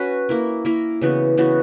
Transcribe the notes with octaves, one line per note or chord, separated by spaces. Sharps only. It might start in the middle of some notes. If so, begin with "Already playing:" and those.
Already playing: C#4 F#4 B4
A#3 E4 A#4
A#3 E4 A#4
C#3 E3 B3 F#4
C#3 E3 B3 F#4